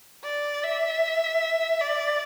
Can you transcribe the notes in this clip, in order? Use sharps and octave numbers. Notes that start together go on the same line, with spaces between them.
D5
E5
D5